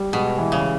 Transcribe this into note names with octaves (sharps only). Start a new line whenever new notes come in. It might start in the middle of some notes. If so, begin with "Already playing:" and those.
Already playing: G3
B2 G#3
E3
C#3